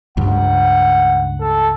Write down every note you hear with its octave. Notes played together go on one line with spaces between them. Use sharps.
C#2 G2 F#5
A4